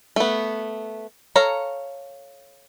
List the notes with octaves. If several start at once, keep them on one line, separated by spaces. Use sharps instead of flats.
A3 B3
A4 C#5 F5 A#5